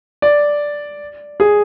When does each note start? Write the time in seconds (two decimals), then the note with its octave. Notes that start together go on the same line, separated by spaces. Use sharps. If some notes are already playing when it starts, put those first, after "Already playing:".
0.22 D5
1.40 G#4